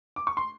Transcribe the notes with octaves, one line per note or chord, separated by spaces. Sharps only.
D6
C#6
C6